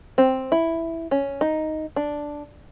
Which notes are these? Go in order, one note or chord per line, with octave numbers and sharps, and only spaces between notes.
C4
E4
C#4
D#4
D4